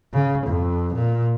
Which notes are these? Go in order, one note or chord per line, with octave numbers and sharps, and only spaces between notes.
C#3
F2
A#2